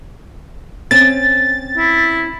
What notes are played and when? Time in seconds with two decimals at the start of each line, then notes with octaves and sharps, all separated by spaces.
0.91 C4 C#4 A6
1.77 E4